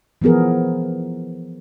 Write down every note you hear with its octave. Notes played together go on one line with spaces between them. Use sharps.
E3 F3 B3 G#4 A#4